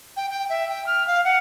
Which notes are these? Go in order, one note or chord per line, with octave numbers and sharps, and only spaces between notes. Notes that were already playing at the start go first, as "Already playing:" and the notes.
G5
G5
E5
G5
F6
F5
F#5